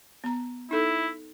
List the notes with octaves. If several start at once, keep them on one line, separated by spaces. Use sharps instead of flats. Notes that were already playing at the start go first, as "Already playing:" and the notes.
B3 A#5
D#4 E4 A4